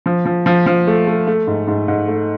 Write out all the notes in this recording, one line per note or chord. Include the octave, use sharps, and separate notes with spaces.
F3
F3
F3
F3
A3
A3
A3
G#2
G#2
G#2
A3